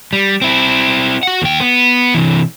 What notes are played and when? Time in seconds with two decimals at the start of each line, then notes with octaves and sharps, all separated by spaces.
0.13 G3
0.42 C4 E4
1.23 F#4 F#5
1.42 D#2 G5
1.60 B3
2.14 C3 E3